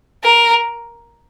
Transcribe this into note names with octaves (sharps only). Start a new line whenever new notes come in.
A#4